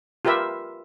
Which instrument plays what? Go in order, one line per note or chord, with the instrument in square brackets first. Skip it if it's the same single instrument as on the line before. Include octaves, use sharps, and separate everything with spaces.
[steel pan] F4 G4 A#4 B4 E5